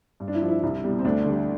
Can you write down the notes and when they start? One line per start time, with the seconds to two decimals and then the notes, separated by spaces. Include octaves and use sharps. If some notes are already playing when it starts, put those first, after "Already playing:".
0.20 G2
0.28 D4
0.35 E4
0.41 F3
0.49 E4
0.62 C2 E4
0.83 B2 G3
0.99 C4
1.05 D2 D4
1.25 D3 G3